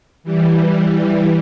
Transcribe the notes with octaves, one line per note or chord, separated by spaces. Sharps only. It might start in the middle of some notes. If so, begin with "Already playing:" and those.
E3 G3